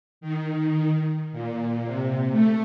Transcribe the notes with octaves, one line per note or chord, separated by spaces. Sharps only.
D#3
A#2
C3
A3